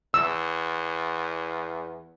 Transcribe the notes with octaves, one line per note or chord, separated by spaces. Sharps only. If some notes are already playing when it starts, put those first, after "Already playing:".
E2 E6